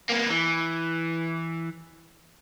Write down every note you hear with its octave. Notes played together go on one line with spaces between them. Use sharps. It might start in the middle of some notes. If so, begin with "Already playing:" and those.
A#3 B3
E3